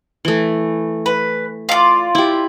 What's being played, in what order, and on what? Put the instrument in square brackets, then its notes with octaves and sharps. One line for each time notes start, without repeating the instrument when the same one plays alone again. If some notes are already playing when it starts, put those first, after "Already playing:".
[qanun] E3 A3
[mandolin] B4
F4 D5
[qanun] E4 G4